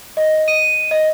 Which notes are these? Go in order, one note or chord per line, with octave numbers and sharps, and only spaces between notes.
D#5
D#7
D#5